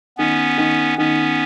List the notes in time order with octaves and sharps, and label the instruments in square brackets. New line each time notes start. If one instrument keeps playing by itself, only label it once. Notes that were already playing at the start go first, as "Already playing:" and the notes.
[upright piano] D#3 [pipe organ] B3 C#4
[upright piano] D#3
[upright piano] D#3 [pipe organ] B3 C#4